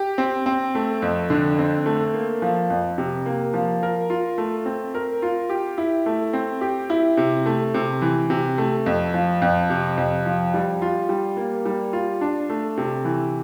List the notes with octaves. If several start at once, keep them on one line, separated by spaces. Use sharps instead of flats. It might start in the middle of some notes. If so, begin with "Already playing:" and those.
Already playing: G4
C4
C4
A3
F2
D3
C4
A3
A#3
F3
F2
C3
A#3
F3
A#4
F4
A3
C4
A#4
F4
G4
E4
A3
C4
G4
E4
C3
A3
C3
E3
C3
A3
F2
F3
F2
C3
F2
F3
G3
F4
G3
A#3
G3
F4
D4
A3
C3
E3